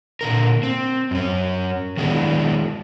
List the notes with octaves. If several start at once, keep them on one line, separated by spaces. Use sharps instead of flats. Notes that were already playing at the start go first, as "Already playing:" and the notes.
A#2 D3 A#4
C4
F#2 C#4
D#3 F#3 G#3 B3 D4 E4